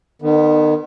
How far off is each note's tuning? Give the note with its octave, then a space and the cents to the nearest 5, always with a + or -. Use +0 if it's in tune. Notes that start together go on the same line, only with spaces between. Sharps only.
D#3 -35 B3 +0